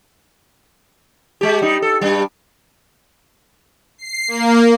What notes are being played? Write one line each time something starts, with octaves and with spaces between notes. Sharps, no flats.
G#3 G4
G3 D#4
A4
G2 G3
C7
A#3